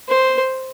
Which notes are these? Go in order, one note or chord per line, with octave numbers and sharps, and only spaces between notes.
C5